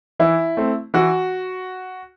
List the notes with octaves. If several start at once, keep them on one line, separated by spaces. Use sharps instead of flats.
E3 E4
A3 C4
E3 F#4